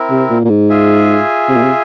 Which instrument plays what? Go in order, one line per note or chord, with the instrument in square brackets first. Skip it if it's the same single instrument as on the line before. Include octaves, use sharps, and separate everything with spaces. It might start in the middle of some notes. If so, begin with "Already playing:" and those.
Already playing: [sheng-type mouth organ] C4 E4 A#4
[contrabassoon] C3
A#2
A#2
G#2
[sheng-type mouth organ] F4 G#4 E5 G#5
[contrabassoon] C3
A#2
C3